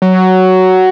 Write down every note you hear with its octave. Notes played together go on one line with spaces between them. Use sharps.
F#3